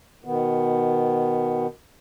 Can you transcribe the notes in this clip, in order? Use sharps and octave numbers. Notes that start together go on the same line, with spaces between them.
B2 D#3 B3